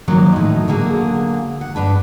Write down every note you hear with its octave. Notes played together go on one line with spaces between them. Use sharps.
D#3 F3 F#3 A#3 C#4
A2 D#4
D3 F#3 A#3 G#4
F#5
G2 D4 B4 A5